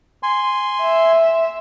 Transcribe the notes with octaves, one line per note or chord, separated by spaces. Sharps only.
G#5 C6
E5